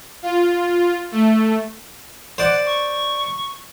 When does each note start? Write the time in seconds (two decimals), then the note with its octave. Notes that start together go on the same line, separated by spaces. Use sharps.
0.22 F4
1.12 A3
2.38 C5 D5 F#5
2.66 C#6